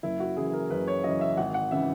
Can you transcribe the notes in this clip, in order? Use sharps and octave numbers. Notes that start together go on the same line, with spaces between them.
F#1 E4
F#4
F#2 C#3 E3 G#4
A#4
F#1 B4
C#5
F#2 C#3 E3 D#5
E5
G#1 F#5
F#5
C#3 E3 E5